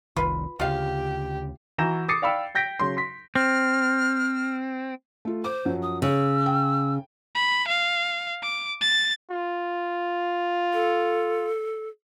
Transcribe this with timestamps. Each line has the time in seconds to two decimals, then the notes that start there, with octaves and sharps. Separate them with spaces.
0.16 F1 C2 D#3 F4 B4
0.60 D2 C#3 F4 G4 F5
1.78 E3 F#4 A#5 G6 A#6 E7
2.09 D6 D#6 A6 C7 C#7
2.22 D5 F5 G5 B5 E6
2.55 G5 G6 A#6 B6 D7
2.80 C#3 F#3 C6
2.97 C6 B6
3.35 C4 F6
5.25 A3 F4
5.44 C5 D6
5.65 F#2 F3 F#3
5.82 D#6
6.02 C#3 G#4 C#5 E6
6.46 G5
7.35 B5
7.67 F5
8.42 D6
8.81 A6
9.31 F4
10.73 A4